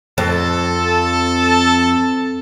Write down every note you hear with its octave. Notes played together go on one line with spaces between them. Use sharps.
F2 A4